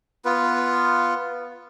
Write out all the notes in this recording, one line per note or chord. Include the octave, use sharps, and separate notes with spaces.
B3 F4 B4